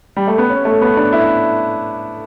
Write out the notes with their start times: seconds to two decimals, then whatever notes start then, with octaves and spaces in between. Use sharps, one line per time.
0.16 G3
0.28 A3
0.38 B3
0.50 C#4
0.65 A3
0.81 B3
0.97 D4
1.13 E4